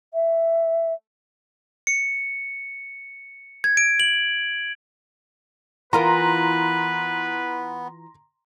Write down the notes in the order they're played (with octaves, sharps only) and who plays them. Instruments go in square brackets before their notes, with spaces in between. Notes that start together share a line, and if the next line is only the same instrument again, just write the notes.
[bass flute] E5
[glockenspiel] C#7
G#6
D7
F#7
[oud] E3 F4 A#4 [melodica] B3 [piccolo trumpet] B4 [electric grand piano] A#5 C6